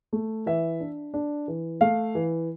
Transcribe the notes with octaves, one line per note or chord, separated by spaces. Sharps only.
A3
E3 E5
D4
D4
E3
A3 F5
E3